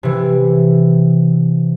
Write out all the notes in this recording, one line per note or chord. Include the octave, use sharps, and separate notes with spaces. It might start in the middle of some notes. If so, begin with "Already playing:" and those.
C3 E3